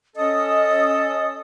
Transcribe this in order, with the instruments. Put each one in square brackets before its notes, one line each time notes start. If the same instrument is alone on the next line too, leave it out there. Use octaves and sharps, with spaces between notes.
[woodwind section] C#4 A4 [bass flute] D#5 [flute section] D#6